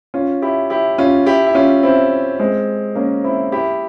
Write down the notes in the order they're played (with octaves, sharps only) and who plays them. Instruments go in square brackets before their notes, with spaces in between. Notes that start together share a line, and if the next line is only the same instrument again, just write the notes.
[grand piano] C#4 F4
E4 G4
E4 G4
C#4 F4
E4 G4
E4
C#4 F4
C4 E4
G#3 C4
A#3 C#4
C4 E4
E4 G4